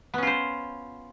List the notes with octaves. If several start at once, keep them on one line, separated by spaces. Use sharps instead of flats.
B3 C#4 F4 C5